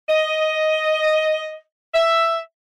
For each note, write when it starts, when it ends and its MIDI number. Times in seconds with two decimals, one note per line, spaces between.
0.08 1.60 75
1.94 2.39 76